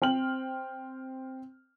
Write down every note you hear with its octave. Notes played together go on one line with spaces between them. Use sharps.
C4 G5 F6 F#7